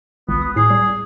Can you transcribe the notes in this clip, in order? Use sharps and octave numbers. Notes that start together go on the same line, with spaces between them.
G#1 C#2 B3
D#6
A2 G#4 C7
G3